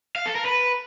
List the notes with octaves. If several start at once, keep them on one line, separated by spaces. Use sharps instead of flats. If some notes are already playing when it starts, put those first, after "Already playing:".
F5
A4
A#4
B4